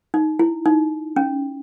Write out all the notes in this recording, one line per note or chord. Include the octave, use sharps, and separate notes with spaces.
D#4
E4
D#4
C#4